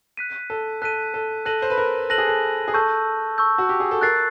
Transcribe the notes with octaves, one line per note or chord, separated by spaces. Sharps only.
F#6 B6 D#7
A4
A4 F#6 B6 D#7
A4
A4 F#6 A#6 D#7 F#7
C5
B4
A#4
A4 F#6 A#6 D#7 F#7
G#4
A4
G#4
A4 A5 C#6 E6 G6
A5 C#6 E6 G6
F#4
G4
G#4
A4
A#4 F#6 A6 C7